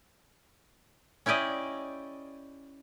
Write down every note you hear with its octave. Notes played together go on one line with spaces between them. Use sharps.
C#4 E4 G4 D5 D#5